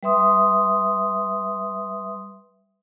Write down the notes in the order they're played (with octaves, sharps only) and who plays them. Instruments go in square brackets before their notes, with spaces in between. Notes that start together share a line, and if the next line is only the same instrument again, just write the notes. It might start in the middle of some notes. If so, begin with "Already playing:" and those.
[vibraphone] G3 B4 E5 C6 D#6